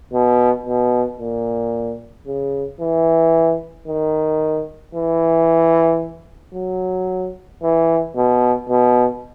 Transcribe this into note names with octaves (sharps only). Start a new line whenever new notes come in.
B2
B2
A#2
C#3
E3
D#3
E3
F#3
E3
B2
B2